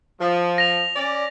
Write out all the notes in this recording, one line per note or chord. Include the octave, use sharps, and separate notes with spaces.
F3
A#6 F7
C#4 D5